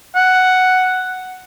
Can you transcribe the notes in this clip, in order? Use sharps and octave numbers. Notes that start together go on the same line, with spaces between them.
F#5